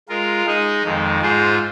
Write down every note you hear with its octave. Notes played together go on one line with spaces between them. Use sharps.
G#3 F4 A#4
G#3 D#4 G#4 D#5
F2 D#3 G#3
G#2 G#3 F4 G#4 C5